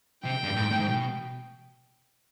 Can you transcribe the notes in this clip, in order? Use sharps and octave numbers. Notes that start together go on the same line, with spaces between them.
C3 G5
G2
A2
G#2
A2
G#2
B2